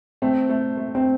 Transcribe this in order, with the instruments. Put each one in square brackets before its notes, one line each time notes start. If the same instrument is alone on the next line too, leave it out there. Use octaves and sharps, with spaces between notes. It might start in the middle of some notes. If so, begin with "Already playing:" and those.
[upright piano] A3 [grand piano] C4
[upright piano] A3
A3
[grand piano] C4